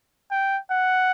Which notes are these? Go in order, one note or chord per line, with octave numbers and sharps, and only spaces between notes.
G5
F#5